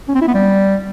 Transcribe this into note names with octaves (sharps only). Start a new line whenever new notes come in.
C#4
C4
E4
B3
G3